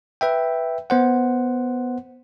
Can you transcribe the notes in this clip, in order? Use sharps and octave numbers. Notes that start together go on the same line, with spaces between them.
B4 E5 G5
B3 C5 F#5